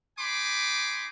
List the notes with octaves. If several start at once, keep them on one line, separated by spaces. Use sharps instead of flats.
D#4 G#5 B5 C6 D6